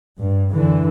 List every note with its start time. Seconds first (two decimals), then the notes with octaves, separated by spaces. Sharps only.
0.19 G2
0.51 F#2 D3 E3